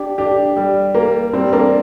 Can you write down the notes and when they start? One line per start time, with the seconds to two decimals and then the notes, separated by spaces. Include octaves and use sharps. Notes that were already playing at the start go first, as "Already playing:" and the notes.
Already playing: D4 G4
0.18 D4 G4
0.57 G3
0.95 A#3
1.33 G3 C4
1.53 A#3 D4